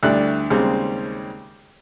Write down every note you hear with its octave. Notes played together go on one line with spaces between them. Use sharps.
D2 G3 D4 E4 D6 F#6
D#2 C#3 G3 G#3 C4